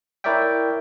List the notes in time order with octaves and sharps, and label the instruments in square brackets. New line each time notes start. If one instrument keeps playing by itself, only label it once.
[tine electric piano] E4 A#4 C#5 D5 E5 G5